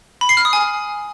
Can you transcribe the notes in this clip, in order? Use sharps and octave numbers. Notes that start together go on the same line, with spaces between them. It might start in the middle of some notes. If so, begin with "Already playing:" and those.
B5
C7
F6
D#6
G#5